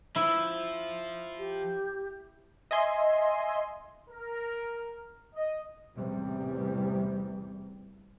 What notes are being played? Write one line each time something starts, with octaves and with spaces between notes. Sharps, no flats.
F3 E4
G4
D#5 E5 G#5 C6
A#4
D#5
A1 E2 C3 G3